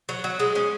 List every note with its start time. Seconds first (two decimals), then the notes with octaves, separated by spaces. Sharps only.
0.09 F#3
0.24 F#3
0.40 G#3
0.55 G#3 C#4